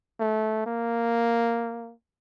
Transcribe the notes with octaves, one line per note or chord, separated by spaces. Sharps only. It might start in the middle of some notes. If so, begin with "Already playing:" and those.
A3
A#3